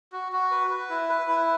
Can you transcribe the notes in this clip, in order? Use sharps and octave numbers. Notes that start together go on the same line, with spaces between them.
F#4
F#4
B4
B4
E4
B4
E4